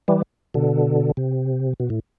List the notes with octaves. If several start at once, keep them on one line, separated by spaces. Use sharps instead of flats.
E3 G3
B2 D3
C3
B2
A2